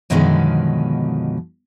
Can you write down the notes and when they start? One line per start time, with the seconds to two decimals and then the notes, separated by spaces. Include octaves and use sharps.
0.10 F#2 B2 D3 D#3 F3 G#3